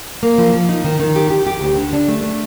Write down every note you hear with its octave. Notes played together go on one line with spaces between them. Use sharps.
A#3
F3
F3
D#4
D#3
D#3
G4
G4
G4
D2
D3
D4
A3
A3